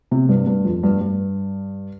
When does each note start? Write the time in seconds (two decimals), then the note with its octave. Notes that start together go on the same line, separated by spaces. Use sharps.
0.11 C3
0.29 G2
0.47 G2
0.65 F2
0.83 G2
1.01 G2